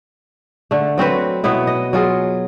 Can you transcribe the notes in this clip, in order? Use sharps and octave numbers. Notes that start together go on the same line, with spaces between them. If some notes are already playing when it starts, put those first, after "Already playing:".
D3 A3
F#3 C4 F#4 B4
B2 F#3 B3 E4
D#5
F#3 F4 G#4